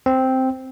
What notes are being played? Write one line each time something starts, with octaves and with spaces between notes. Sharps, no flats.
C4